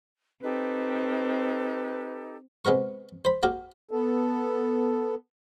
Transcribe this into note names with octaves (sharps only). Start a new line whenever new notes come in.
C4 D#4 G4 A4 B4
C3 G#3 B3 A#4 C#6
C5 B5
A#3 F#4 G4 A#4
B3 A4